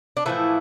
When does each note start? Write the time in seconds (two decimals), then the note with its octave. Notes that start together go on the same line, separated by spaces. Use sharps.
0.17 D4
0.26 A2 E3 F3 A3 E4